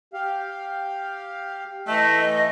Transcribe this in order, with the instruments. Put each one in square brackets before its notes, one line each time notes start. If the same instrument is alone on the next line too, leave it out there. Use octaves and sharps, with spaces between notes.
[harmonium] G4 F5
[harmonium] E3 [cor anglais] A3 [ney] D#5